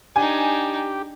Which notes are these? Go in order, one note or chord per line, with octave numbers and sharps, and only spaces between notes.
D4 D#4 G4 G#5